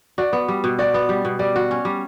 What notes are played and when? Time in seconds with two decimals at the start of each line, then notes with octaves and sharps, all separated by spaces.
0.18 F#4 D5
0.33 B3
0.48 G3
0.64 B2
0.79 F#4 D5
0.94 B3
1.09 G3
1.25 B2
1.39 G3 D5
1.56 F#4
1.71 C#4
1.85 G3